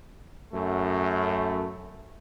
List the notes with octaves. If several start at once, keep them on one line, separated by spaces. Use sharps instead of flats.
F#2 A3